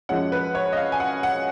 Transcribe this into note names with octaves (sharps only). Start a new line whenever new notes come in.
F#2 F3 G#3 C#4 F#5
B4
C#5
D#5
F5
G#5
F#5
F#5